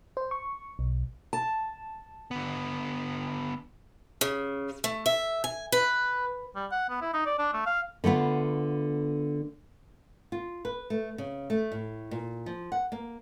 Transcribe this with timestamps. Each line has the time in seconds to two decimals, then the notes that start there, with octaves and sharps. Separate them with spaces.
0.17 C5
0.31 C#6
0.79 B1
1.33 A5
2.31 D3 B3
4.21 C#3
4.84 A3
5.06 E5
5.44 G#5
5.72 B4
6.55 G3
6.72 F#5
6.90 B3
7.02 E4
7.14 D#4
7.26 D5
7.39 D4
7.53 A3
7.66 F5
8.04 D3 A3 B3 F4
10.32 F4
10.65 B4
10.90 A3
11.18 C#3
11.50 A3
11.72 A2
12.11 A#2
12.46 F3
12.72 F#5
12.92 A#3